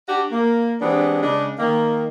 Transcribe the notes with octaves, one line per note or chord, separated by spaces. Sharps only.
D4 F#4 G4
A#3
E3 G3 G#3 B3 C4 D4
C#3 G#3 D4
D#3 A#3